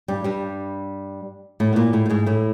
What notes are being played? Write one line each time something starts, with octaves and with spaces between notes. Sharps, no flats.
G2 G3
G2 G3
A2 A3
B3
A#2 A#3
A2 A3
A3
G#2 G#3
A2 A3